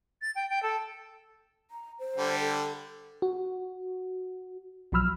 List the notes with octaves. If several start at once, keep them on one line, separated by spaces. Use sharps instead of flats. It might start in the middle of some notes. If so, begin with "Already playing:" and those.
A6
G5
G5
A4
A#5
C5
D3 G3
A4
F#4
B1 F3 F#3 B5 E6 F6